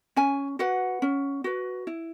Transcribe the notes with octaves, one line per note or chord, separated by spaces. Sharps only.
C#4 G#5
F#4 B4 F#5
C#4
F#4 B4
E4